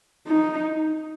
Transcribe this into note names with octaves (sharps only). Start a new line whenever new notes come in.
D#4